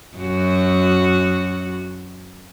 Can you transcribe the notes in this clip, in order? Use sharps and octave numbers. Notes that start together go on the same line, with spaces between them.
F#2 F#4